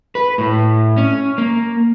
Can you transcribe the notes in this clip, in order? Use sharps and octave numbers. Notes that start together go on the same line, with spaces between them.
B4
A2
C#4
A#3